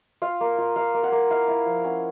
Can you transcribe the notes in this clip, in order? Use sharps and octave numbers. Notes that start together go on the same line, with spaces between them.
F4 F5
A#3
F4
A#3 F5
A#3
F#5
A#3
E4 F5
E4
F3
C#4 F#5